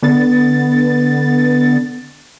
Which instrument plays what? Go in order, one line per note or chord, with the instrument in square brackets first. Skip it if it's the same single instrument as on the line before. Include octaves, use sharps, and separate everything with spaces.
[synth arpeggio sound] D3 B3 A6